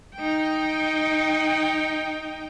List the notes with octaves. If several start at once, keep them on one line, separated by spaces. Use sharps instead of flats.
D#4 G5